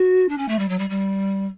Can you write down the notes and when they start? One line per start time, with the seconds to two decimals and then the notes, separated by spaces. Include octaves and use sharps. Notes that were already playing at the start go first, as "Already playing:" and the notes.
Already playing: F#4
0.29 D4
0.38 C#4
0.48 A3
0.59 G3
0.68 F#3
0.79 G3
0.89 G3